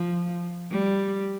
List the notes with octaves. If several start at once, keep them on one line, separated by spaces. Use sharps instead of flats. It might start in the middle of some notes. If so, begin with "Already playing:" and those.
Already playing: F3
G3